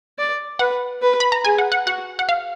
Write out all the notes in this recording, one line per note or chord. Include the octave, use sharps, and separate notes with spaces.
D5
B4 F#5
B4
B5
A#5
G#4 G#5
F#5
F#5
F#4 F#5
F#5
F5